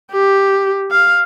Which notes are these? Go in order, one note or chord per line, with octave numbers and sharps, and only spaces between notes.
G4
F5